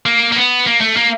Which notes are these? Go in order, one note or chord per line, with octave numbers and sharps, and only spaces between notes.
A#3
A#3
B3
A#3
A3
A#3